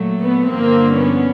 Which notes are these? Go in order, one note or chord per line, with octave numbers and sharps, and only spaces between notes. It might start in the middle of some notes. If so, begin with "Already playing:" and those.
Already playing: A#2 F#3 A3
B3
G2 D3 F3 A#3 C4
B3 C#4